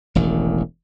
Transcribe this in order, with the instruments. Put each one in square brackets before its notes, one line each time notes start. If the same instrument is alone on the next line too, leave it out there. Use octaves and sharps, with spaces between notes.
[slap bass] E1 A1 D#3